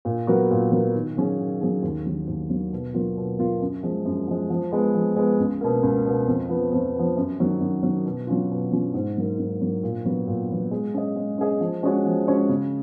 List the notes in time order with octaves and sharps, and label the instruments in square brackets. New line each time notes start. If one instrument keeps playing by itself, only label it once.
[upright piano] A#2
F#3 B3 F#4 A#4
A#2
F#3 B3 F#4 A#4
D#3
F#3 C#4 G#4
D#3
F#3 C#4 G#4
D#2
D#3 F#3
D#2
D#3 F#3
B2
F#3 A#3 F4
B2
F#3 A#3 F4
F#2
F3 G#3
F#2
F3 G#3
F3
G#3 B3
F3
G#3 B3
C#2
B2 A#3
C#2
B2 A#3
F2
F3 B3
F2
B3
F3
F#2
D#3 F#3
F#2
D#3 F#3
B2
F#3 C#4 F4
B2
F#3 C#4 F4
G#2
F#3 A#3
G#2
F#3 A#3
A#2
F#3 B3
A#2
F#3 B3
G#3
C#4 G#4 D#5
G#3
C#4 G#4 D#5
F3
G#3 C#4 F#4 C#5
F3
G#3 C#4 F#4 C#5
C#3